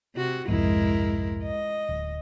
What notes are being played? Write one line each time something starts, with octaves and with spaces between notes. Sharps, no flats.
C3 F#4
C2 F2 G#2 G#3 E4 A#4
D#5
D1